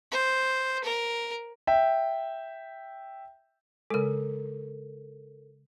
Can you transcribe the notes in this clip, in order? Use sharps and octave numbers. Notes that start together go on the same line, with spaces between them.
C5
A#4
E5 G5
C#3 G#3 A4 A#4